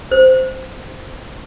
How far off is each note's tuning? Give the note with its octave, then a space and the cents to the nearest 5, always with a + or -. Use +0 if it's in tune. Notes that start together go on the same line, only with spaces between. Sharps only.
C5 -15